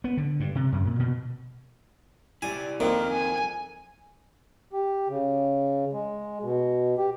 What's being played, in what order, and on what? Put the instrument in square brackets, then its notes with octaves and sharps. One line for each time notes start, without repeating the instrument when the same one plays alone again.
[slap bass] B3
D3
G2
C3
F#2
A#2
B2
[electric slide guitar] E4 G4 D5 [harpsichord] G#5
[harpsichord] F2 D#3 [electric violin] A#3 [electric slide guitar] C4 F4
[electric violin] G#5
[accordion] G4
C#3
G#3
B2
G4